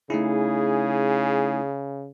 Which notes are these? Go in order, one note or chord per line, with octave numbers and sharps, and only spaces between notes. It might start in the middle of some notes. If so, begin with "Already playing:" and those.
C#3 A3 D#4 E4 G#4